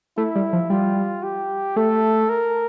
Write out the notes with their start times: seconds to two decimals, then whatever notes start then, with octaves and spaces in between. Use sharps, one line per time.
0.17 A3 E4
0.35 G3
0.53 F3
0.70 G3 F4
1.24 G4
1.76 A3 A4
2.29 A#4